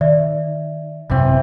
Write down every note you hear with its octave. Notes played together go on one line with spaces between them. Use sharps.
D#3 D5 E5
G#1 F#2 C3 E3 C4